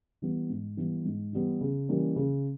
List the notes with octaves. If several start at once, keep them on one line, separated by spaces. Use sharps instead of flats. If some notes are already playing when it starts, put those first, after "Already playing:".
E3 G3 B3
G#2
E3 G3 B3
G#2
E3 G3 B3
C#3
E3 G3 A#3 C#4
C#3